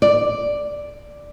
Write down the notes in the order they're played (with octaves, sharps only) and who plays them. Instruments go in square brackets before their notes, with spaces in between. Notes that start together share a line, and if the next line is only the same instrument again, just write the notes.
[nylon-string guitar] D5